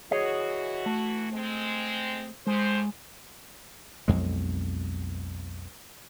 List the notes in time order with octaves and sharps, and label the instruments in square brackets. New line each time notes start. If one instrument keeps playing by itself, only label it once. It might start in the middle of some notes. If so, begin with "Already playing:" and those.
[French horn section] E3 F#4 [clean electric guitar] G#4 C#5 D#5
[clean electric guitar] A3
[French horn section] G#3 C4
[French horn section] A2 C5 [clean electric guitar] G#3
[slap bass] B1 F2 G#3